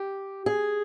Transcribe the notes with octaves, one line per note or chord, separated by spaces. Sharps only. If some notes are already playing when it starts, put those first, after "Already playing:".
Already playing: G4
G#4